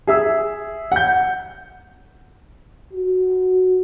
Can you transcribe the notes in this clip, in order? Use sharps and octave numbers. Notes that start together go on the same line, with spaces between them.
G#4 E5 E6
F#5 G6
F#4